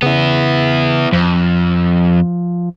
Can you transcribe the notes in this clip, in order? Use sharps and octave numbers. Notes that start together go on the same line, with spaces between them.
C#3 B3 E4
F2 F3